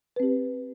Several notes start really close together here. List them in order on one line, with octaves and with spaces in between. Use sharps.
B4 C4 G4